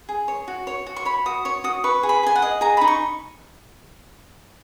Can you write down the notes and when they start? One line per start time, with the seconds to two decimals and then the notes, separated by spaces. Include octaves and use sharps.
0.09 G#4
0.28 C#5
0.48 F#4
0.67 C#5
0.86 F#4
0.96 C#6
1.05 C#5 B5
1.26 F#4 D#6
1.45 C#5 C#6
1.64 F#4 D#6
1.84 B4 C#6
2.03 G#4
2.09 B5
2.23 G#4 G#5
2.35 F#5
2.42 D#5
2.61 G#4 A#5
2.77 D#4 B5
2.88 C#6